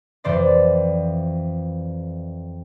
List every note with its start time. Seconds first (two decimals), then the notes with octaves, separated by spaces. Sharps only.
0.24 F2 E3 C5 D5 A6